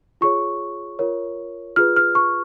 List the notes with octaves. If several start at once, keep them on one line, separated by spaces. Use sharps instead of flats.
F4 G#4 C#5 C#6
F4 A#4 C#5
F4 G#4 B4 F6
F6
C#6